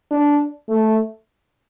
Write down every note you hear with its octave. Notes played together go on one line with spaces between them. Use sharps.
D4
A3